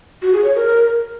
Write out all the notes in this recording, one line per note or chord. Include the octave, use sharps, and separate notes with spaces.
F#4
G#4
C#5
A#4